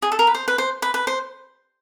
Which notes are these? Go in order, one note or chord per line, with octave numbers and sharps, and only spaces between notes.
G#4
A4
A#4
B4
C5
B4
C5
B4
B4
C5